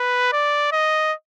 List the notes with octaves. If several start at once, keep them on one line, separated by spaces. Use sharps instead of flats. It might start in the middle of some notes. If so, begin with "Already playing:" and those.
Already playing: B4
D5
D#5